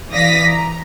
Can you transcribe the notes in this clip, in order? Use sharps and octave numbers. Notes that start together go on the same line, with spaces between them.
E3 D5 F5 D#6 A#6 B6
A#5